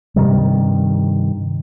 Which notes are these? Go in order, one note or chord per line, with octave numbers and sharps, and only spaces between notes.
G2 C3 D#3 G3